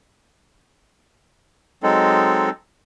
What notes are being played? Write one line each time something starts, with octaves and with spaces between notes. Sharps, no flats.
F#3 G#3 C4 D#4 A4